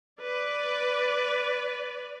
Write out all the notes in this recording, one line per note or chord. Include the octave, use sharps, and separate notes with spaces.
B4 D5